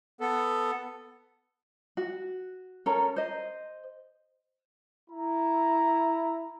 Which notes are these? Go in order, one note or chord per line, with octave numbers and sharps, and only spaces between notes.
B3 A4
F#4
C#4 A4 A#4 A#5
C5 D#5
E4 A#5